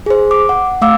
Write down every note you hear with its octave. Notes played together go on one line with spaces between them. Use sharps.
G#4 C5
D6
F#5
A3 F5 D6 E6